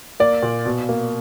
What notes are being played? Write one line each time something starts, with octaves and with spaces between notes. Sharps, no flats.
A#3 D5
A#2
B2
A#3